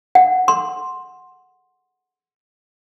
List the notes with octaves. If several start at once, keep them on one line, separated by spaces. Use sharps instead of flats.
F#5
C6